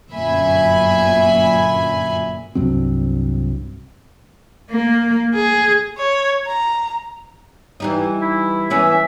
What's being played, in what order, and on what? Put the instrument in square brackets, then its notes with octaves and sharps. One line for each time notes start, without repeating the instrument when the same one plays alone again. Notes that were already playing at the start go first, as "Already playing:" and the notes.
[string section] G1 F#2 A#2 E5 G#5 B5
[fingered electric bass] C2 G2 F#3 C4
[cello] A#3
G#4
[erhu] C#5
A#5
[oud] E3 G3 D#4
[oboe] E4
[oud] E3 B3 C#4 [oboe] E5